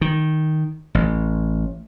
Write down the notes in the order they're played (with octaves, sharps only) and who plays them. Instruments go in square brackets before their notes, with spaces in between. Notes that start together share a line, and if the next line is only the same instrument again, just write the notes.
[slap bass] D#3
A1